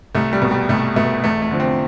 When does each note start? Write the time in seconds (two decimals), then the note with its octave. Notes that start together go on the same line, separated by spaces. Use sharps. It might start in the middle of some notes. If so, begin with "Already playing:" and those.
0.15 C2 A3
0.33 G3
0.42 B2
0.51 G3
0.69 C2 A3
0.96 B2 A3
1.24 E2 A3
1.42 A3
1.51 D3 F3
1.60 C4